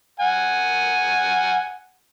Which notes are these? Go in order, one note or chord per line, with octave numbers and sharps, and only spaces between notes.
F#5 G#5